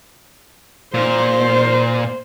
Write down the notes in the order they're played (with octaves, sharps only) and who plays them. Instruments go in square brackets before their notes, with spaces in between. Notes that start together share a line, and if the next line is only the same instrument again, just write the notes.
[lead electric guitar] A#2 [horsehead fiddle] C5